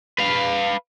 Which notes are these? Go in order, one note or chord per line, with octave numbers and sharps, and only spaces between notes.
B4 F5